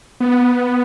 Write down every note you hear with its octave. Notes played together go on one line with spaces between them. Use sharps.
B3